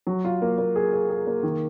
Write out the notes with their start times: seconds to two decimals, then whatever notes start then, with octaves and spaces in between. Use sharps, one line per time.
0.07 F#3
0.25 F4
0.42 A#3
0.58 A#3
0.76 G#4
0.92 G#4
1.10 G#4
1.27 A#3
1.43 D#3